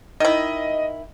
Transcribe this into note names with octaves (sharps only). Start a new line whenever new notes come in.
D#3 E4 D#5